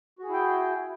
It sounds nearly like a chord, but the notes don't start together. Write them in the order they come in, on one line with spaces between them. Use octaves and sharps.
F#4 G#4 E4 G5